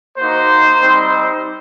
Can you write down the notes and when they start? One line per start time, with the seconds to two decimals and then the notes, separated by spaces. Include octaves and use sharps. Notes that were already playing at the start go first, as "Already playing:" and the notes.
0.18 A#3 D#4 F#4 C5
0.80 G3 C4 D#4